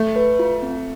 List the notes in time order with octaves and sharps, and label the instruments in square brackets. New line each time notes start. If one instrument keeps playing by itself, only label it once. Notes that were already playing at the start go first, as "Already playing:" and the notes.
Already playing: [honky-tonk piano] A3
[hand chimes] B4
F4
C4